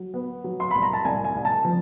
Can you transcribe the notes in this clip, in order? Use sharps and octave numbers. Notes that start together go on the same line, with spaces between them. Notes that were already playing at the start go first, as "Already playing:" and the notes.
Already playing: F#3
B3
F#3
C6
C2 B5
A#5
A5
C2 G#5
G#5
C2
A5
F3